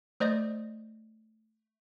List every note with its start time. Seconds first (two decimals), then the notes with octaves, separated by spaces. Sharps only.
0.20 A3 C5 D5 D#5 D#6 G6